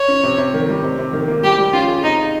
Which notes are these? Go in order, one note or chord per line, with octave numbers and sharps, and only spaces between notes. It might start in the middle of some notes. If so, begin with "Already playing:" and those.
Already playing: C#5
C#4
C3
C3
D#3
G3
C3
C3
D#3
A#3
G3 G4
G3
C#4 F4
G#4
C3 D#4
D#4